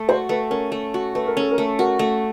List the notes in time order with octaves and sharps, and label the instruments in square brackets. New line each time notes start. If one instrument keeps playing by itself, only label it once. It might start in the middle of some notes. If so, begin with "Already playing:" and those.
Already playing: [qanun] A3
[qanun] F#4 [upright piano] C5
[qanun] A3 [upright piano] B4
[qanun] C#4 [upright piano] A#4
[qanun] A3
F#4
[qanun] A3 [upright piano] B4
[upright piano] A#4
[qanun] C#4 [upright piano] A4
[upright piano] A#4
[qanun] A3
[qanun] F#4 [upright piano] A#4
[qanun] A3